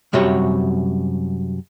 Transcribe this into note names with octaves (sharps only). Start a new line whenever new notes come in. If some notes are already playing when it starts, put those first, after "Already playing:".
F#2 C3 G3 F#4 C#5